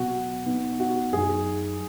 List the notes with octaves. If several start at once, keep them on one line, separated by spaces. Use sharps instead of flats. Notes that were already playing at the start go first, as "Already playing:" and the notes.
Already playing: B2 F#3 B3 F#4
B2 B3 D#4
F#4
F#2 F#3 D#4 G#4